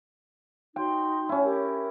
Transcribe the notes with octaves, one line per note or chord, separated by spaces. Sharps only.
D#4 F#4 G5 C6
C#4 E4
G4 A#4